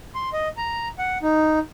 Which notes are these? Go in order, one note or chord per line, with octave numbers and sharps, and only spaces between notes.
C6
D#5
A#5
F#5
D#4